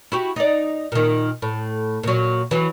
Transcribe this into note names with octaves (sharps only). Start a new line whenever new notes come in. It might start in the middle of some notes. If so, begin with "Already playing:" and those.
E4 F#4 G4
D#4 D5
A#2 D#3
A2
A#2 F#3
E3 F#3